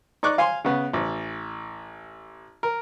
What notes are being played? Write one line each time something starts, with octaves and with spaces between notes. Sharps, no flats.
D#4 D5 C#6 D6 F#6
F5 G#5 C6
C#3 B3
A1
A#4